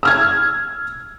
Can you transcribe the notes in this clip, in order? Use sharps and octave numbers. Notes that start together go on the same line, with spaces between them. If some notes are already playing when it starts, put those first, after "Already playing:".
E6 F6 G#6